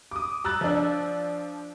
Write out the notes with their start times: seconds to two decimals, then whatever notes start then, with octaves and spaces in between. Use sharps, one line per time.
0.11 D6 D#6
0.44 A#5 E6 F#6 A6
0.61 F3 D4